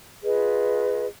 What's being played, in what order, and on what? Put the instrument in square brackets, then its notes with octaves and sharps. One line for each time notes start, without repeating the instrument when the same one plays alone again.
[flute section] F4 G#4 B4 D#5